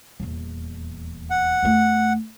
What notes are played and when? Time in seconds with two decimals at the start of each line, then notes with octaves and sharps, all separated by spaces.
0.20 D#1 E2
1.30 F#5
1.63 E2 A3